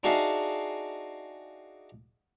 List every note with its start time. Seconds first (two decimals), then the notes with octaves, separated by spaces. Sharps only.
0.03 D4 D#4 F#4 G#4 E5 F5